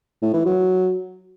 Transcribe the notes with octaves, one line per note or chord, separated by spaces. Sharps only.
A2
E3
F#3